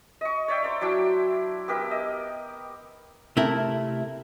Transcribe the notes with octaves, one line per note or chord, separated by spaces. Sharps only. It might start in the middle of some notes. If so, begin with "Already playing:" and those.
D#5 C#6
C#5 D5 E5 G5
C5 D5 A#5
F#3 D4 E4 G5
B3 G4 A#4 E5
D#5
C3 A3 E4 A#4